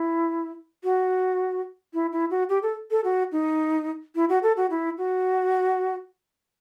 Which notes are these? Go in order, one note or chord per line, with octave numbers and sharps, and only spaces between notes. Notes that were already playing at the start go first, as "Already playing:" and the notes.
Already playing: E4
F#4
E4
E4
F#4
G4
A4
A4
F#4
D#4
E4
F#4
A4
F#4
E4
F#4